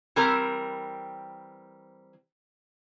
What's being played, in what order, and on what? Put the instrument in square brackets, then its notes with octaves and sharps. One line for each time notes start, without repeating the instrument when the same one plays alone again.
[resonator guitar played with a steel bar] E3 G3 C4 A#4